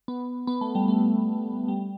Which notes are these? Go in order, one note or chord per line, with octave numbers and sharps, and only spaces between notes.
B3
B3
A3
G3
A3
G3